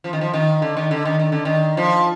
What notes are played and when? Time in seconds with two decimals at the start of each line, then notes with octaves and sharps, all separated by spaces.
0.04 F3
0.13 D#3
0.21 F3
0.34 D#3
0.62 D3
0.77 D#3
0.91 D3
1.05 D#3
1.19 D#3
1.32 D3
1.45 D#3
1.77 F3